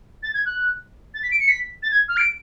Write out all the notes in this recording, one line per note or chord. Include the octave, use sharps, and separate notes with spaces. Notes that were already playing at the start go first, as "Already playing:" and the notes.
A6
G#6
F#6
A6
B6
D7
C#7
B6
A6
G#6
F6
D7